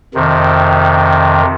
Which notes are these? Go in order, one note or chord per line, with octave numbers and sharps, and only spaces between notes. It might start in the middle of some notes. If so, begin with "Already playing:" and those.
F2 C3 D#3